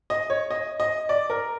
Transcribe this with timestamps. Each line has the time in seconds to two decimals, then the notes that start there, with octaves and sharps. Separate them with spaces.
0.10 D#5
0.30 C#5
0.51 D#5
0.80 D#5
1.09 D5
1.30 A#4